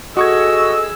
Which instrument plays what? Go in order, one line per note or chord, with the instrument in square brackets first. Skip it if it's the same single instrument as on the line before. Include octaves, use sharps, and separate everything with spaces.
[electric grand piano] F#4 C#6 G#6 [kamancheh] G#4 E6 [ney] A4 [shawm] D#5